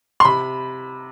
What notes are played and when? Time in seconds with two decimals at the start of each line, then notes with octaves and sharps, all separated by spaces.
0.20 C6
0.25 C3 B5